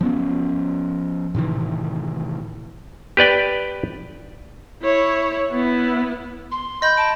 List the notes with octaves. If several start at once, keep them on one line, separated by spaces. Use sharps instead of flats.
F3 B3 C#4
A2 C3 D#3 E3
G4 B4 D5 G5
E4 C#5
B3 E4
C6
D#5 B5 G6
A5 D7